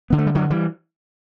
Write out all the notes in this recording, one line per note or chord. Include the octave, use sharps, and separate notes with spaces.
D3 B3
A3
G3
G2 D3 F#3
E3 G3